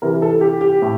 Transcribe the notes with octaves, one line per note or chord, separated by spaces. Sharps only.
C3 E3 G3 A#4
A4
G4
G4
A2